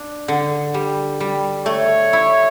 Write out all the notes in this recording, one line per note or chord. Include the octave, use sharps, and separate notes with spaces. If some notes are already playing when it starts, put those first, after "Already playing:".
Already playing: D4
D3
G3
G3
A3 C#5
E4